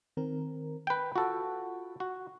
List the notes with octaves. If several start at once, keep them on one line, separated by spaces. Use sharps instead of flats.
D#3 C4 A#4
B4 G5
F4 F#4 A4 F#5
F#4